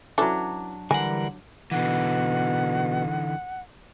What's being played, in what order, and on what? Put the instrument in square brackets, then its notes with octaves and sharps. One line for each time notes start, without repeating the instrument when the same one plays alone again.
[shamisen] E3 C#4 A4 [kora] F#3 D4
[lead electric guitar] D3 F#5 [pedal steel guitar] E3 G3 A#4 [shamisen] G#5
[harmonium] B2 [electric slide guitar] D3 E3 [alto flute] F#5